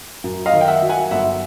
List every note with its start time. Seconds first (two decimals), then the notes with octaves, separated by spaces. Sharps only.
0.24 F#2
0.46 D#5 F5
0.53 D#3
0.61 G5
0.68 E5 F#5
0.82 F#3
0.89 F#5 G#5
1.11 G1 E5 F#5